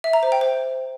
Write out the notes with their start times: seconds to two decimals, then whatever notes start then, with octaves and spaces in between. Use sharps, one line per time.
0.04 E5
0.13 A#5
0.23 C5
0.32 G5
0.41 C5